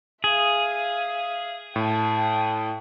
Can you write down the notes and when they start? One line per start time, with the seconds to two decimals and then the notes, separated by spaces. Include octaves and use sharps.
0.24 G#4 E5 F5
1.76 A2 G5 A5